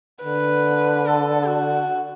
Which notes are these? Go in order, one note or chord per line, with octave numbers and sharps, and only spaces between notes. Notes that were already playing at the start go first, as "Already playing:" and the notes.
D3 B4
A4
F#4